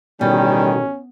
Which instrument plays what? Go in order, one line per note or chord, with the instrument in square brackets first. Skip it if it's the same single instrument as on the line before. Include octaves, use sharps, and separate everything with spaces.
[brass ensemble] A1 D#3 [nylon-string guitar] B2 [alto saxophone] G3 [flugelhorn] C#4